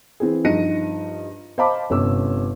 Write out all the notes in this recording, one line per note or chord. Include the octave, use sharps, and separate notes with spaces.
E3 C4 G#4
G2 F3 D#4 A#6 C#7 D#7
C5 D#5 F5 A5 B5 D6
G1 C3 C#4 D6 E6